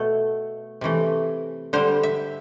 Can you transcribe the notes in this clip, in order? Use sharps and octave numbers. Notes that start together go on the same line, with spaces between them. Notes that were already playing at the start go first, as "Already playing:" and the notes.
Already playing: B2 A3
C3 E3 A3
D3 G3 C5
E5